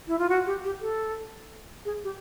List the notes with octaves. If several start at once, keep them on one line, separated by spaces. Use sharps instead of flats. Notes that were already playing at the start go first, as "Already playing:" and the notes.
E4
F4
F#4
G4
G4
A4
G#4
G4